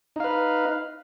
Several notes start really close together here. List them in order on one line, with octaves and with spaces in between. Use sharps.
D#4 F5 B4